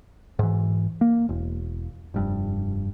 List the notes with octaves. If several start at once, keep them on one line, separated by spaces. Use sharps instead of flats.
G#2 E3
A#3
E1
F1 G2